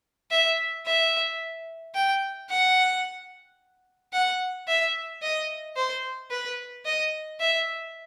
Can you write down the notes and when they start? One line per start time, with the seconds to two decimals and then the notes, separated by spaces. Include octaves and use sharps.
0.31 E5
0.86 E5
1.94 G5
2.50 F#5
4.13 F#5
4.67 E5
5.22 D#5
5.76 C5
6.31 B4
6.85 D#5
7.40 E5